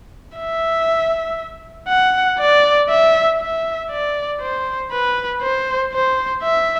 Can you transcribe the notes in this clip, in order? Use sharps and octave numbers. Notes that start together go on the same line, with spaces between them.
E5
F#5
D5
E5
E5
D5
C5
B4
C5
C5
E5